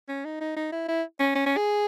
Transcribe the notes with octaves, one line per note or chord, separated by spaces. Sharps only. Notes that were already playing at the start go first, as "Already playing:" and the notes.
C#4
D#4
D#4
D#4
E4
E4
C#4
C#4
C#4
G#4